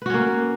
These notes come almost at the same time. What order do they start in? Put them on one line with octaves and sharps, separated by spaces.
B4 F#4 C#4 A#3